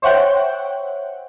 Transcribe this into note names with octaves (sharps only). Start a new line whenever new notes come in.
C5 C#5 E5 F#5 G5